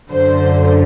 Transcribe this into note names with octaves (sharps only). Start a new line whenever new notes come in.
F#2 D3 C5